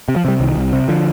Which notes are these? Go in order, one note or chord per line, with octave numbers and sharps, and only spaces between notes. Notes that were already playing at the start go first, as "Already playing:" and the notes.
C3
F3
C3 G3
C2 D#3
C2
C3
D3 F3